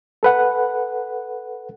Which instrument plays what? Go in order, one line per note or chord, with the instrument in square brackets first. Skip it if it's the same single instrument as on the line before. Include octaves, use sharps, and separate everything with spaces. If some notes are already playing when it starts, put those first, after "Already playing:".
[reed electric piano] A4 B4 F#5